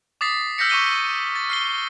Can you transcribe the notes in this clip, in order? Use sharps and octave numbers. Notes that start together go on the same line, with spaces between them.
D6 D#6 A6 B6 C7
E6 F6 G6 A#6 B6 C#7
C#6 D6 D#7 G7
A6
F6 C7 G7